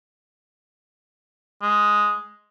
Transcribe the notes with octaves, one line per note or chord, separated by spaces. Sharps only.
G#3